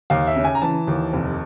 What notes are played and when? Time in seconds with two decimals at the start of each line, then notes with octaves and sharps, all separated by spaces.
0.10 D#2 F5
0.27 E5
0.36 C#3
0.44 G#5
0.55 A#5
0.62 E3 A5
0.87 D#2
1.13 F1